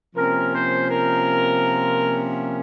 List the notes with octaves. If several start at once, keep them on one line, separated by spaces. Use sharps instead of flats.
C3 F3 A#3 C#4 A#4
C5
A#4